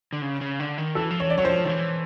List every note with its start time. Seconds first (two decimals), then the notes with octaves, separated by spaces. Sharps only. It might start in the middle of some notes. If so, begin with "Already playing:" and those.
0.13 D3
0.22 C#3
0.41 C#3
0.60 D3
0.78 D#3
0.95 E3 A4
1.11 F3
1.20 E3 C#5
1.30 D5
1.38 F#3 C#5
1.44 F3 C5
1.64 D#3
1.69 E3